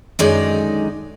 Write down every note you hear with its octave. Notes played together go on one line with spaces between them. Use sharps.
F#2 D3 D#3 G#3 D#4 D5